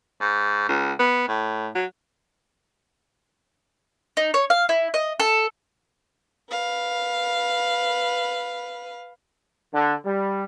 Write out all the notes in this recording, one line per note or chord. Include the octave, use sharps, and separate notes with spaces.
G#2
C#2
B3
A2
F#3
D#4
C#5
F5
E4
D#5
A4
B4 F5
D3
G3